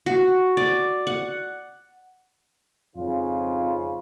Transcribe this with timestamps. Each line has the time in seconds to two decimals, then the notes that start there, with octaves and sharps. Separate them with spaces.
0.06 F#4
0.57 D5
1.07 F#5
2.96 F2 G#2 C#3 F4